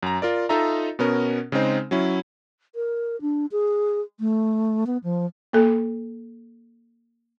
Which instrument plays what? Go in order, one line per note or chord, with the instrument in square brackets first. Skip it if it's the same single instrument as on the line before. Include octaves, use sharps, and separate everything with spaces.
[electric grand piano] F#2 A#5
F4 A#4 D5
D#4 F4 A4 D#5 E5 A#5
B2 B3 C#4 A#4
C#3 G#3 C4 D#4 C5
F#3 C#4 E4
[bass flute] A#4
D4
G#4
A3
B3
F3
[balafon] A#3 A4